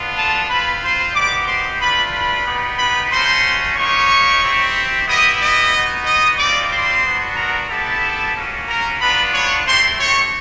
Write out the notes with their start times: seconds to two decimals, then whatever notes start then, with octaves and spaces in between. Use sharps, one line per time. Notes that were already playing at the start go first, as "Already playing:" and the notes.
Already playing: B3 D4 F4
0.17 A4 A5
0.49 C4 F4 B4 B5
0.83 C5 C6
1.14 B3 D#4 G4 D5 D6
1.47 C5 C6
1.80 A3 D4 F4 B4 B5
2.12 B4 B5
2.45 B3 D#4 G4
2.78 B4 B5
3.11 A3 C#4 F#4 C5 C6
3.76 A#3 D#4 G4 C#5 C#6
4.41 C4 E4 G4
5.07 B3 E4 G4 D#5 D#6
5.40 D#5 D#6
5.73 B3 D#4 F#4
6.05 D#5 D#6
6.37 G3 C4 F4 D5 D6
6.70 C5 C6
7.04 B3 D4 F#4
7.36 A#4 A#5
7.69 B3 E4 G4 A4 A5
8.34 A#3 C#4 F#4
8.67 A#4 A#5
9.00 B3 D4 F4 B4 B5
9.32 C#5 C#6
9.65 A3 C4 E4 G4 C5 C6
9.98 C#5 C#6